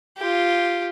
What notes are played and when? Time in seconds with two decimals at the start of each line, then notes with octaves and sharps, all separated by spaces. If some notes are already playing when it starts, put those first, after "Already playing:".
0.18 F4 G4